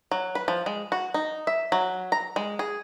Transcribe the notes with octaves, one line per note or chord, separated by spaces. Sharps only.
F#3
B4
F3
G#3
F#4
D#4
E5
F#3
A#5
G#3
G#4